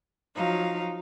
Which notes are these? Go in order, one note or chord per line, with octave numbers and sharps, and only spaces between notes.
F3 F#3 D#4 F5